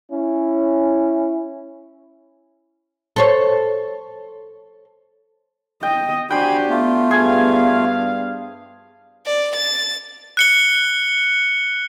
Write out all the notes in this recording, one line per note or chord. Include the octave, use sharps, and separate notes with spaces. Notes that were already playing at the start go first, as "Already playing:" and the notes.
C#4 E4
A4 C5 C#5
D#5 G5
D4 F#4 G4 C5 G5 G#5 B5
A3 B3 F4
G2 G#4 F5 G#5
D5
A6
F#6 C#7 G7